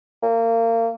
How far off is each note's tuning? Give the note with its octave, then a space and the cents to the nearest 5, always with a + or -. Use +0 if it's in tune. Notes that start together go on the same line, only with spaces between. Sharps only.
A#3 -30